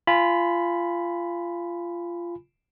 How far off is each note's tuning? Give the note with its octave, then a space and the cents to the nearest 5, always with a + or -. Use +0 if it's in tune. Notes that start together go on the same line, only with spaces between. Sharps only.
F4 -20 G#5 +0 B5 +0